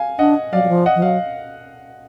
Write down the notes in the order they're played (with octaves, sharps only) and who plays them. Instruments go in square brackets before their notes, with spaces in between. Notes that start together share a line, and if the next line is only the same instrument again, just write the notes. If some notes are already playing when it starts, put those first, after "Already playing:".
Already playing: [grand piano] F5 G#5
[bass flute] D4 [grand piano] D#5 F#5
[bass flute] F#3 [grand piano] D5 F5
[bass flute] F#3
F3
[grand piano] D#5 F#5
[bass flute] F3
[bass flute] F#3 [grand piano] F5